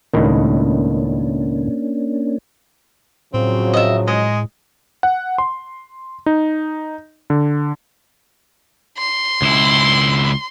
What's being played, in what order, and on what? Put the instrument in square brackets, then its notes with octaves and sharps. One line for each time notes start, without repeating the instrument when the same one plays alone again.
[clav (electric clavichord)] C#2 A2 D#3 [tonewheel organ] A#3 C#4 D4
[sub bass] A2 [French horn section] C#3 F3 F#3 [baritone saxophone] C4
[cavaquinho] D#5 E5
[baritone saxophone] G#3 [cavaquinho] D#5
[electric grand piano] F#5
C6
D#4
D3
[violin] C6
[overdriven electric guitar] C#2 E4